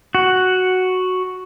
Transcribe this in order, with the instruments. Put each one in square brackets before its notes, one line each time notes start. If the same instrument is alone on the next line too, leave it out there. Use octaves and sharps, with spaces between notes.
[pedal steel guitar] F#4